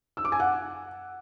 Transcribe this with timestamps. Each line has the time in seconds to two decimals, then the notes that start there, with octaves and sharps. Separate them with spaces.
0.17 E6
0.25 D6
0.32 G#5
0.40 F#5